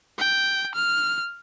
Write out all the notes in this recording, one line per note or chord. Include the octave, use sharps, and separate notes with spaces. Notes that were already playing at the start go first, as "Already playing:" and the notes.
G5
F6